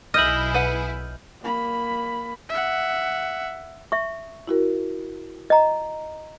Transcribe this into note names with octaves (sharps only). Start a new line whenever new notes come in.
B1 E4 G#4 D#5 E5 F6 G6 F#7
B4 F#5
A#3 B5
E5 F#5
E5 C#6
E4 F#4 A#4
D#5 A#5